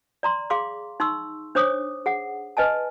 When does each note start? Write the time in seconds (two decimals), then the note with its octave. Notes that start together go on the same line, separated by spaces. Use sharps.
0.23 D5 A#5 C6
0.50 G#4 F5 C6 D6
1.00 D#4 C6 C#6 E6
1.55 D4 C5 C#5 D6 D#6
2.06 G#4 F#5
2.57 B4 D#5 G#5 A5